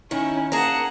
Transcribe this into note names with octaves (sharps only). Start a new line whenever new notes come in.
D#3 C#4 E4
A#3 G#4 F#5 A5 A#5